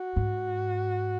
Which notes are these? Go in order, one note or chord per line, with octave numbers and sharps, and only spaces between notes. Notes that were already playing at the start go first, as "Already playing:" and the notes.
Already playing: F#4
G#2